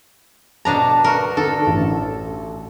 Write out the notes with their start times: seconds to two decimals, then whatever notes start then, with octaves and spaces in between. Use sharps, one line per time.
0.65 B2 D4 A5 A#5
1.04 F#4 A#4
1.37 D3 A4
1.66 A1